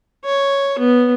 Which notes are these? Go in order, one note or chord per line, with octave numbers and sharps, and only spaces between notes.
C#5
B3